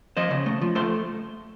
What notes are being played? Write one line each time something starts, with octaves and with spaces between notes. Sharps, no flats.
F3 C5 D#5
C#3
A3
F3
A3 A4 C5